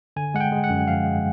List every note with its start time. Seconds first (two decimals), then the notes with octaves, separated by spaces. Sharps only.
0.16 D3 G#5
0.34 G#3 F#5
0.40 G5
0.52 G#3
0.64 F#5
0.70 F#2
0.88 F3 F5
1.06 G#3